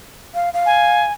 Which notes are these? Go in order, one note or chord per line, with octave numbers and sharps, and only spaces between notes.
F5
F5
G#5